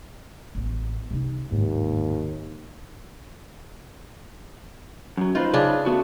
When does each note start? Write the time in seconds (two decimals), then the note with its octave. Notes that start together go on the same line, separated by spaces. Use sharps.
0.55 A1 B3
1.11 C3 D#4
1.51 F#1 D#2 G#2 D3
5.17 F#2 F#3
5.35 D#4 F4 B4 C5
5.54 C#3 D4
5.86 A3 B3 F#4